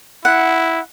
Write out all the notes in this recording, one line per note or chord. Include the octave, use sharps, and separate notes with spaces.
E4 F#5